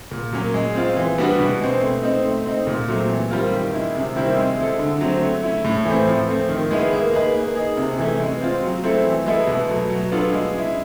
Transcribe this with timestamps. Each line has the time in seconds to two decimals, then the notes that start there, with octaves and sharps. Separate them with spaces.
0.11 A#2
0.33 F#3 A#3 C#4
0.54 G#3
0.75 C4 F4
0.97 E3
1.18 G3 B3 D4 F#4
1.39 B2
1.60 G#3 C4
1.81 A3
2.03 C4 D#4
2.24 A3
2.46 C4 D#4
2.67 A#2
2.88 F#3 A3 C4
3.10 E3
3.31 G3 C4 F4 A#4
3.52 D#3
3.73 G#3 C#4 E4
3.94 C3
4.16 D#3 G3 C4 E4
4.37 G#3
4.58 C4 E4 A4
4.79 D3
5.01 F#3 A3 C4
5.22 A3
5.43 C#4 E4
5.65 A2
5.85 E3 A3 C4
6.07 F3
6.28 A3 C4
6.49 D#3
6.71 G#3 B3 E4 G#4
6.93 A#3
7.13 D#4 G#4 B4
7.34 A#3
7.55 D#4 G#4
7.77 C3
7.98 E3 A3 C#4
8.20 G#3
8.41 C4 F4
8.63 F#3
8.84 A3 C4 E4 A4
9.04 E3
9.26 G#3 B3 E4 A4
9.47 B2
9.69 F#3 A3
9.90 F#3
10.12 B3 D4 F4 A4
10.33 G#3
10.54 C#4 E4